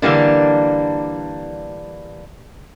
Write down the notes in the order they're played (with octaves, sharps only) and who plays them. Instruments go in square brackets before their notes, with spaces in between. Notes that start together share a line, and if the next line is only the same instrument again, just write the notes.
[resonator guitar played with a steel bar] D3 E3 G3 A#3 D4